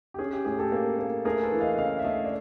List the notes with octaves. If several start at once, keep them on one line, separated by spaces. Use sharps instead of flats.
G4
C#4 G#4
G4
A2 G#4
G4 A4
A#3
A#3
A3 G#4 A#4
A4 B4
E3
D#5 F5
C#3 D#5 F5
E5
A3 D#5 F5
D5